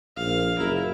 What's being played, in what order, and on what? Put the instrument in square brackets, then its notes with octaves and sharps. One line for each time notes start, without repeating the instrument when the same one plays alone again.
[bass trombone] A#1 [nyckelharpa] F5
[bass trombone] F#1 [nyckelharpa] E4 A#4